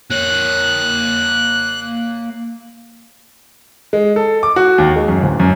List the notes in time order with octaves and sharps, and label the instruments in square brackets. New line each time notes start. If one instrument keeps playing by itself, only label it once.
[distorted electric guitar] A#3 C#5 [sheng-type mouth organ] F#6
[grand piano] G#3
A4
D6
F#4
D#2
G#3
F#2
D1
F#2